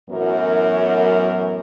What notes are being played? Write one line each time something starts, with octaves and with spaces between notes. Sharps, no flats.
F#2 A2 E3 F#3 B3 A#4